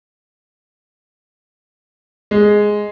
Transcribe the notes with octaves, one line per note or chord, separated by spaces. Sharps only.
G#3